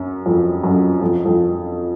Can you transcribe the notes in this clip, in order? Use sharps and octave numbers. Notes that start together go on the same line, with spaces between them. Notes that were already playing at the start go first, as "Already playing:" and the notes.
Already playing: F#2
F2
F#2
F2
F2